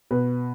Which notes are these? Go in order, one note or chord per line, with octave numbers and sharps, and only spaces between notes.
B2 B4